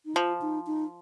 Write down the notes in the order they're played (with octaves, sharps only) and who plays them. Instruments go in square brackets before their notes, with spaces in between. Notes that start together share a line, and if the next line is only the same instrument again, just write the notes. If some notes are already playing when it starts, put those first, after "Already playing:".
[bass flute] D#4
[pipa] F3 [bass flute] F4
[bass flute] D#4
D#4